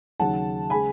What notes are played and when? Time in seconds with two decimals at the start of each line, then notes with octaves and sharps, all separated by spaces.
0.20 D#2 C#3 F#3 F#5 A5
0.70 C#3 G#3 G#5 B5